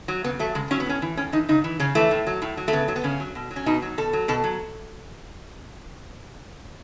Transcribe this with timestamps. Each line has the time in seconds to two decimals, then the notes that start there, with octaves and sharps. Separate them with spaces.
0.08 F#3
0.24 C#3 B3
0.39 F#3 A3
0.55 C#3 G#3
0.71 F#3 C#4
0.80 B3
0.86 A2 C#4
1.02 E3
1.17 A2 C#4
1.32 E3 D#4
1.49 C#3 D#4
1.64 E3
1.80 C#3 C#4
1.95 E3 A3
2.11 A2
2.27 F#3
2.42 A2
2.57 F#3
2.68 A3
2.73 C#3 B3
2.88 F#3
2.96 B3
3.04 C#3 C#4
3.20 F#3
3.35 B2
3.51 F#3
3.56 C#4
3.66 B2 D#4
3.82 F#3
3.98 B2 A4
4.13 F#3
4.28 B2 A4
4.44 F#3